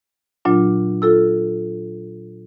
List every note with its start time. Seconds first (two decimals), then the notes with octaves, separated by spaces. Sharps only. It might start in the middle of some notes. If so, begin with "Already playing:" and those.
0.45 A#2 F#3 D4 F4
1.02 F4 A4 E6